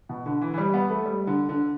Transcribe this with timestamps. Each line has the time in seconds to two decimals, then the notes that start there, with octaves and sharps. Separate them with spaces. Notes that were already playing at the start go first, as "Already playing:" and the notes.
0.09 B2
0.26 D3
0.41 E3
0.54 E3
0.58 G3
0.74 B3
0.90 A3
1.05 G3
1.27 D3
1.49 D3